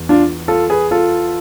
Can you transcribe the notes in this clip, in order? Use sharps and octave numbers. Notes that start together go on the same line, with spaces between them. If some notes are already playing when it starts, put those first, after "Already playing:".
Already playing: E2
D4 F4
F4 A4
G#4 B4
F4 A4